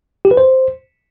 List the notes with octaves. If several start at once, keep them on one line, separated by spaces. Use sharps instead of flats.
G4
B4
C5